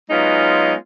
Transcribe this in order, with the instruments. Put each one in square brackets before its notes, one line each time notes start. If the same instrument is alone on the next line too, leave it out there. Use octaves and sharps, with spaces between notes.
[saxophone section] F#3 G#3 B3 C#4 D#4 F4